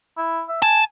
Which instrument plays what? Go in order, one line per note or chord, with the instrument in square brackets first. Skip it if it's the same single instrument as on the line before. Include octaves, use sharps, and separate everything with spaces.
[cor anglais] E4
E5
[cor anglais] G#5 [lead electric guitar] A5